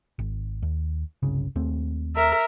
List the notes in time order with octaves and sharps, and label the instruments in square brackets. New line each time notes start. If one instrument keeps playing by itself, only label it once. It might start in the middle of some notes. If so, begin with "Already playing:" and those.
[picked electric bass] G#1
D#2
G1 C2 C#3
D#2 A3 C4
[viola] A#4 E5